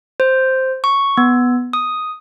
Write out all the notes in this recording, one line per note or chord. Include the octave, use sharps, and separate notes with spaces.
C5
C#6
B3
D#6